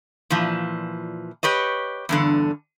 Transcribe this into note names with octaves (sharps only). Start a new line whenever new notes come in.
A#2 E3 F3
G4 B4 C#5 D#5
E2 G2 D3